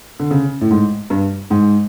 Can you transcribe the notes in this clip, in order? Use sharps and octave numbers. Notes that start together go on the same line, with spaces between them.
D3
C#3
A2
G#2
G2
G#2